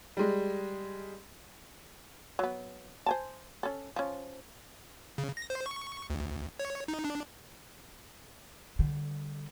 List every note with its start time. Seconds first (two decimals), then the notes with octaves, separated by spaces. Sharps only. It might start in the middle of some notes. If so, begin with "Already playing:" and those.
0.17 G3 G#3
2.39 F#3 B3
3.06 C5 G#5 A5
3.63 C#4 A4
3.96 F3 C#4
5.18 C#3
5.37 A#6
5.50 C5
5.66 C#6
6.10 D2
6.59 C#5
6.88 D#4
7.05 D4
8.79 D3 G3